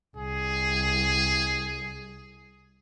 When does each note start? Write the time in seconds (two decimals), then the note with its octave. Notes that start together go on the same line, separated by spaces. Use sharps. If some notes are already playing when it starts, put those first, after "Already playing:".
0.16 C2 G#4